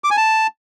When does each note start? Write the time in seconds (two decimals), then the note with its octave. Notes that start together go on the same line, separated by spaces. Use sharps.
0.04 D6
0.11 G#5
0.17 A5